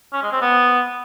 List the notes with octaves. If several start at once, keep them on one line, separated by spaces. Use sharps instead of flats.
C#4
G#3
C4
B3